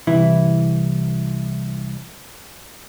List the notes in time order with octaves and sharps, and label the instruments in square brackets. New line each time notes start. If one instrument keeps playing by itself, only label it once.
[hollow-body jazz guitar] C2 E3 E4